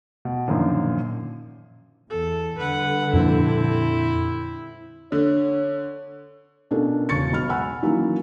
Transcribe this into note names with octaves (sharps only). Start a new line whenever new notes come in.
B2
F#2 A#2 D3 D#3 F3
E2 A4
D3 G3 B4 F#5
F2 A#2 C4 D4 E4
D3 C#5
B2 C#4 D4 F4 A4 A#4
E1 C#3 C#6 A6 C#7
B1 G#3 B5 F6
F#5 G#5 B5 E6
D#3 E3 F#3 A#3 C#4